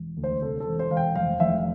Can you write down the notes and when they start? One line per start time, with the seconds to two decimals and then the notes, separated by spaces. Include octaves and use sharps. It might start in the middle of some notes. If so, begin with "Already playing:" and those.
Already playing: E1
0.17 D2
0.24 C5
0.42 C3 A4
0.60 A4
0.66 E1
0.79 C5
0.91 E1 F5
0.97 G5
1.15 F1 F5
1.40 F1 E5